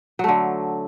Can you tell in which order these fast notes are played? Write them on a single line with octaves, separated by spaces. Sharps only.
F#3 A3 D3